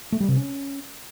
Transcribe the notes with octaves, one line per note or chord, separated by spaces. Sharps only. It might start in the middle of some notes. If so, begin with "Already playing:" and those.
A3
G3
C3
C#4